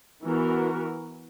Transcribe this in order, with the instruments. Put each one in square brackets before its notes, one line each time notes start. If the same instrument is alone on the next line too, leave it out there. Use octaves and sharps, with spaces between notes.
[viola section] E3 B3 F#4 A#4